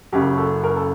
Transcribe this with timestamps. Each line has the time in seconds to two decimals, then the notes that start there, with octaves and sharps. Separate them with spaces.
0.12 F#1 F#2 C#3 F#3 G4
0.37 A4
0.64 A#4
0.76 A4